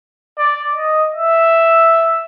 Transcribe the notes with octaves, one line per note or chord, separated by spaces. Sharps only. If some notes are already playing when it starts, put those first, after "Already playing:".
D5
D#5
E5